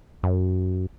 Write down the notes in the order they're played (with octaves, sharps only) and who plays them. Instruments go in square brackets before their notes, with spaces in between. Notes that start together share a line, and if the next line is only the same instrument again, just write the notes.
[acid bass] F#2